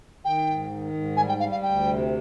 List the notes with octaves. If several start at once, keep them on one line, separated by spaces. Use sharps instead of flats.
D#3 G5
G#2
D#3
G#2
G3 G#5
G5
G3 F5
F5
D2 G5
C3